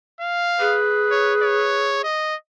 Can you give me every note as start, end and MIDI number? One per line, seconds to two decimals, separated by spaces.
0.21 0.78 77
0.60 2.02 68
0.60 1.97 71
1.11 1.34 73
1.43 1.99 73
2.04 2.35 75